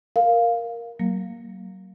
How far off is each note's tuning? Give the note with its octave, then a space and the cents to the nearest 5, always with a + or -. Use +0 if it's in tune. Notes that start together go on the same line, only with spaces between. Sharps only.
A#4 +0 F5 +0
F#3 +30 A#3 -5